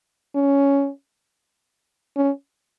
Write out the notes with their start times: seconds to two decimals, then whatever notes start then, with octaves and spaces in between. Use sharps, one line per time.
0.35 C#4
2.17 C#4